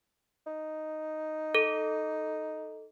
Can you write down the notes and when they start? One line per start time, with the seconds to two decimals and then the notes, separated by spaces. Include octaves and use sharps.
0.46 D#4
1.55 A4